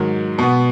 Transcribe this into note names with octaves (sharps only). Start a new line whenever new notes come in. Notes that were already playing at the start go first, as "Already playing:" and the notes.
Already playing: G#2 D#3 F#3
B2 B3